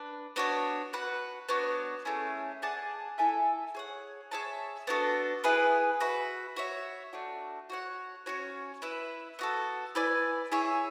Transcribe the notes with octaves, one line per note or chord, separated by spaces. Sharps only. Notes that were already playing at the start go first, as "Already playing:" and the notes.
Already playing: D4 B4
B3 D4 F#4 C#5
F#4 B4 F#5
B3 D4 F#4 C#5
A3 C#4 E4 G#4
G#4 D5 F#5 A5
E4 A4 E5 G#5
G#4 C#5 F#5
G#4 C#5 E5 A5
B3 D4 F#4 A4
B3 E4 G#4 B4
F#4 B4 E5
F#4 C#5 E5
A3 D4 F#4
F#4 C#5 F#5
C#4 F#4 C#5
E4 B4 E5
B3 F#4 A4
E4 B4 D5 G#5
E4 G#4 C#5 E5